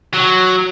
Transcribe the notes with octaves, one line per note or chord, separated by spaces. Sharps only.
F#3